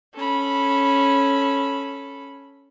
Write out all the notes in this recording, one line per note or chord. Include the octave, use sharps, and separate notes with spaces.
C#4 A4 B5